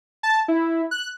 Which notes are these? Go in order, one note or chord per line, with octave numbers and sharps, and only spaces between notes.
A5
E4
F#6